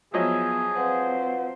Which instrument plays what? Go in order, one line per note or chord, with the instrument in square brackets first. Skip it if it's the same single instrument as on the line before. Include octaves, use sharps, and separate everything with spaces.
[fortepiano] F3 F#3 D#5 [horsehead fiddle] B3 E5 [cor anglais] G#4
[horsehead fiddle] C4 C5 [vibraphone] B4 F5 F#5